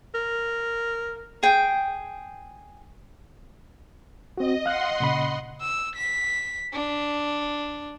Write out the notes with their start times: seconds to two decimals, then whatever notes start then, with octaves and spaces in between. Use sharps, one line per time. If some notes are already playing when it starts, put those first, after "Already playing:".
0.14 A#4
1.43 G#4 G5
4.38 C4 F#4 D#5
4.66 D#5 F5 F#5 C6 F#6
5.00 A#2 C#3 B5
5.62 E6
5.96 B6
6.73 D4